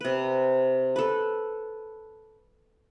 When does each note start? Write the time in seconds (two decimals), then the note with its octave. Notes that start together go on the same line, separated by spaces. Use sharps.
0.01 C3 B4
0.96 A4 B4